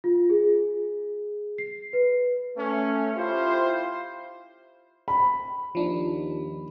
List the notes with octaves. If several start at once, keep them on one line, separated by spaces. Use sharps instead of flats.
F4
G#4
C7
B4
A3 C#4
E4 F4 G4 C5
B5
D#2 F3 D4 D#4